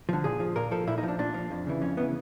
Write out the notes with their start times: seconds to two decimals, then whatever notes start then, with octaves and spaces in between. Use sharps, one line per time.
0.09 D3 F3
0.24 A#2 G#4
0.40 F3
0.56 A#2 A#4
0.71 F3 A4
0.87 A#2 E4
0.98 D#4
1.03 F3
1.08 D4
1.19 A#2 D4
1.34 F3
1.50 F2
1.66 C#3 E3
1.81 F2 C#4
1.97 C#3 E3 B3